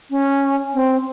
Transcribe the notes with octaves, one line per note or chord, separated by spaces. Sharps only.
C#4
C4